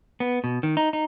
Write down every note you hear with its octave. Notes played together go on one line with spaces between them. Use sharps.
B3
B2
D#3
D#4
D#4